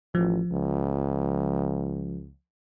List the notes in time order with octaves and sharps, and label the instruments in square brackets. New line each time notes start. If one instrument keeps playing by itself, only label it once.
[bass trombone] A1 [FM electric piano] F3
[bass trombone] C#2